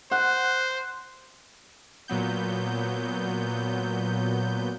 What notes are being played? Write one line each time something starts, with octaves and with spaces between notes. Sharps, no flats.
C5 F#5
A#2 F#3 B3 G6